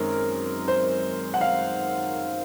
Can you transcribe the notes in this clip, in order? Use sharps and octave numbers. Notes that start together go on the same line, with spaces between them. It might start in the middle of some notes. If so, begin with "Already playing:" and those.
Already playing: F#2 D#3 G#3 C4 A#4
C5
F#5
F5